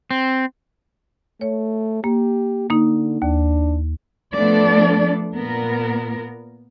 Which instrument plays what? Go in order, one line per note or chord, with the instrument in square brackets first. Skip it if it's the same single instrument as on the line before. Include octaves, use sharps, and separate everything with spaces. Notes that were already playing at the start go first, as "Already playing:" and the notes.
[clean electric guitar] C4
[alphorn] A3 [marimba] C#5
[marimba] A#3 [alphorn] G4
[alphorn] D3 [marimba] A#3 D#4
[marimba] D#2 [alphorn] D4
[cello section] F3 A3 B3 D4 A4 D5
A#2 B3 A#4